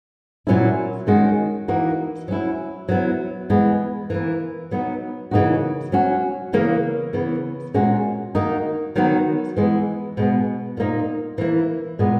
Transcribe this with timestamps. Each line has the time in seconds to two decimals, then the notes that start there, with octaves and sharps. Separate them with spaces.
0.47 A#2 F#3 C#4 E4
1.07 D#3 G#3 C#4 F#4
1.68 E3 A#3 D#4 F#4
2.28 F#3 C#4 E4
2.89 F#3 B3 E4
3.50 E3 G#3 B3
4.10 E3 A#3 E4
4.71 F#3 B3 D#4
5.31 C#3 E3 A#3 D#4 F#4
5.92 F#3 C#4 F#4
6.53 C#3 E3 A#3
7.13 C#3 E3 B3
7.74 A#2 G#3 C#4 F#4
8.35 D#3 A#3 D#4 F#4
8.96 D#3 F#3 B3 F#4
9.57 E3 G#3 B3
10.17 B2 G#3 B3
10.77 A#2 A#3 D#4
11.38 E3 A#3 E4
11.99 A#2 G#3 B3